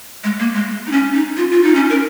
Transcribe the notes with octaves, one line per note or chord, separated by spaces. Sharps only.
G#3
A#3
G#3
D#4
C#4
D#4
F4
F4
D#4
C#4
A#4